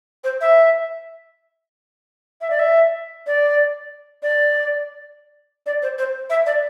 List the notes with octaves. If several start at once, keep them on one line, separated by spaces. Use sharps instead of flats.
C5
E5
E5
D5
E5
D5
D5
D5
C5
C5
E5
D5